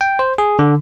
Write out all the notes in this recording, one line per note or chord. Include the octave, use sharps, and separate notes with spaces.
G5
C5
G#4
D3